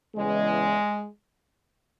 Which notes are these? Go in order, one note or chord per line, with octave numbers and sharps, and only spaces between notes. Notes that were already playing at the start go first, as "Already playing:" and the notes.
E2 C#3 E3 G#3